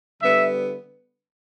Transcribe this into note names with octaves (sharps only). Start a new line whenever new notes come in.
D3 G3 B3 E5